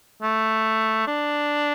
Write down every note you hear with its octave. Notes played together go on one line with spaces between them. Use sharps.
A3
D4